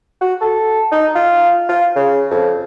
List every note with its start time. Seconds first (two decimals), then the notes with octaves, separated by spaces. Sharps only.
0.21 F#4
0.41 A4
0.92 D#4
1.15 F4
1.69 F4
1.96 C#3
2.31 F2